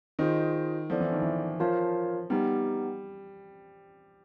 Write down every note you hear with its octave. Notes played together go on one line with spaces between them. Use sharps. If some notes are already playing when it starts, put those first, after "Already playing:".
D#3 F4 G#4 C5 D#5
F3 B3 E4 A4 D5
E3
D#3
E3
F3 F4 A#4 C#5 F5 A5
G3 B3 D#4 G4